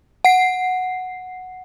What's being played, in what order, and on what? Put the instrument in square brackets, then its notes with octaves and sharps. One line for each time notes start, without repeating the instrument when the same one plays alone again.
[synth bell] F#5 C7